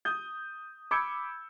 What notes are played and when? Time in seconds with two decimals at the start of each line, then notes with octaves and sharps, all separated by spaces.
0.05 D#6 G6
0.91 B5 D6 E6 G6 G#6 C#7